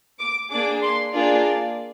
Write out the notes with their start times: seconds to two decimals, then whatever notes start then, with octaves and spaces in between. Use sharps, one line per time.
0.19 D6
0.51 A#3 D4 G#4 D6
0.82 C6
1.14 A#3 D4 F4 G#4 D5